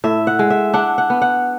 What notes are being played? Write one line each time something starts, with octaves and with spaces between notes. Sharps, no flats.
A2 E5
F#5
G#3
E5
D4 F#5
F#5
B3
F#5